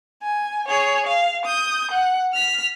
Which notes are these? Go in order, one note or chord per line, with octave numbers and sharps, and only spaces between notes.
G#5
G#4 C#5
F5
D#6 G6
F#5
F6 B6